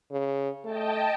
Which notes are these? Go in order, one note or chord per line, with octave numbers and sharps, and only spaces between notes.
C#3
A3 D#5 G5 A5